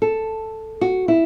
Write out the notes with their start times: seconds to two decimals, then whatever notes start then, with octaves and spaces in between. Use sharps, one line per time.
0.02 A4
0.81 F#4
1.08 E4